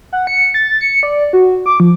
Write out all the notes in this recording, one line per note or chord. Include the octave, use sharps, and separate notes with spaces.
F#5
C#7
A6
C#7
D5
F#4
D6
F3